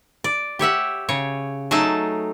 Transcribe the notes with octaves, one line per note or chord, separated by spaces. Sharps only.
D5
G4 C#5 E5 F#5
C#3 C#5
F#3 A3 D#4 G#4 A5